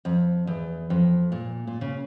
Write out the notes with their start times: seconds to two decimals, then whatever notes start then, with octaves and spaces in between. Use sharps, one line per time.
0.05 F2
0.47 E2
0.90 F2
1.32 A#2
1.67 A#2
1.81 C#3